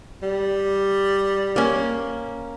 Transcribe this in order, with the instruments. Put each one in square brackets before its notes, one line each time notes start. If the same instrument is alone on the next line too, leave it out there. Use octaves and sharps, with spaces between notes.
[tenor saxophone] G3
[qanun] A#3 C#4